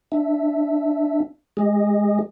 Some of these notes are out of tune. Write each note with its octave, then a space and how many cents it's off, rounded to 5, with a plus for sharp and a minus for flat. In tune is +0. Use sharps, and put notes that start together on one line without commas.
D4 +0 E5 +0
G#3 +0 G#4 -35 D#5 +0